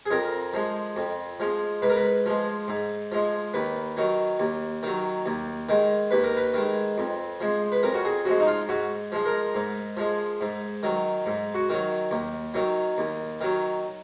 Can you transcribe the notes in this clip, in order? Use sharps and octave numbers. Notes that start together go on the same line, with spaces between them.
G#4
F2 A#4
F3 G#3
F2
F3 G#3
G#2 B4
A#4
B4
F3 G#3
G#2
F3 G#3
D#2 B4
D#3 F#3
D#2
D#3 F#3
D#2
D#3 G#3
D#2 B4
A#4
B4
D#3 G#3
F2
F3 G#3
B4
F2 A#4
F#4
G#4
F3 G#3 F#4
D#4
F4
G#2 F#4
F3 G#3
A#4
G#2
F3 G#3
G#2
D#3 F#3
G#2
F#4
D#3 F#3
D#2
D#3 F#3
D#2
D#3 F#3